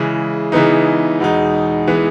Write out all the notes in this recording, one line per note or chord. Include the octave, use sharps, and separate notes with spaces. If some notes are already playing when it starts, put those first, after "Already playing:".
Already playing: C#3 E3 G#3
C#3 E3 G#3 B3 D#4
E2 B2 G#3 D#4
E3 G#3 B3